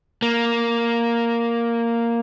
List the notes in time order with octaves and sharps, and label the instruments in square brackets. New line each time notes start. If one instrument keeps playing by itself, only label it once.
[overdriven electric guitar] A#3